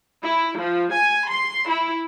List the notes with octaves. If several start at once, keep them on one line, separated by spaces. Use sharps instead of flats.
E4
F3
G#5
C6
E4